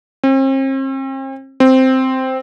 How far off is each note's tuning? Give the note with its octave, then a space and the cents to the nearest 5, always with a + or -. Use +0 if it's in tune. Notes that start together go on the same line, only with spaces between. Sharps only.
C4 +40
C4 -5